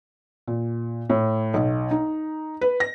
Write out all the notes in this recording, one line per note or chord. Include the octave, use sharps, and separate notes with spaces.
A#2
A2
B1
D#4
B4
A#6